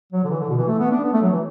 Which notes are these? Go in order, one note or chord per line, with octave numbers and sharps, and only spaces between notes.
F#3
D3
E3
D3
B2
E3
A3
B3
D4
B3
A3
F#3
E3